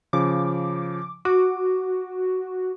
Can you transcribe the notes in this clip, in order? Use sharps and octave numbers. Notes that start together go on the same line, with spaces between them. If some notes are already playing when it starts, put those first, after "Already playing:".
C#3 F3 D6
F#4 D6